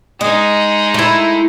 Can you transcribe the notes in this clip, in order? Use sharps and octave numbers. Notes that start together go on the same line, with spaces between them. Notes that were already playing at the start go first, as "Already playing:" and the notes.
G#3 D#4 D#5
A3 E4